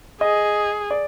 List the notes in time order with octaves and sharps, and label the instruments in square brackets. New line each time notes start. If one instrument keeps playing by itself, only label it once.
[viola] G#4 [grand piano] D#5
[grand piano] D5